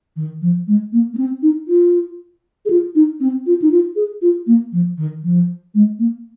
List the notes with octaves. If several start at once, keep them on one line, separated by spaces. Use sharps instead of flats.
D#3
F3
G#3
A#3
A#3
C4
D#4
F4
G#4
F4
D#4
C4
F4
D#4
F4
G#4
F4
A#3
F3
D#3
F3
G#3
A#3